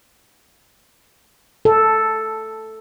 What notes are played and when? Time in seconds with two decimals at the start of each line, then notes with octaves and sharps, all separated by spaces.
1.65 A4